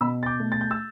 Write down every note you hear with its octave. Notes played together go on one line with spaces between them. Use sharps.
B2 B5 E6
A6
D6 G6
A3
A6
G6
E6 A6